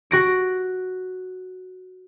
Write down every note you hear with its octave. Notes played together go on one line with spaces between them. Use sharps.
F#4 A#6 D7